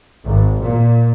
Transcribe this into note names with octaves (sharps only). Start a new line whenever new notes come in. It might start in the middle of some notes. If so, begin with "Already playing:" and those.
G#1
A#2